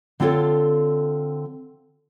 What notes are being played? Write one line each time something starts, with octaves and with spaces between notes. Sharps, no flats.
D3 C4 F4 A4 C#5 D5